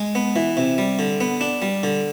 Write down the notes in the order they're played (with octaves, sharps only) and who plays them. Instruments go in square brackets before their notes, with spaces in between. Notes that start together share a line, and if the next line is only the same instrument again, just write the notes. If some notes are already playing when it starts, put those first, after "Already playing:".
Already playing: [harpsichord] G#3
B3
E3
C3
G3
D3
B3
D4
G3
D3